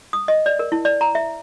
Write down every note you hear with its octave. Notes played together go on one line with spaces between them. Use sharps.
D#6
D#5
D5
A#4
E4
D5
A#5
E5